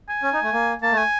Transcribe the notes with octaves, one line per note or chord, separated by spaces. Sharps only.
G#5
C#4
D#4
A3
A#3
A#3 A5
A3 G#5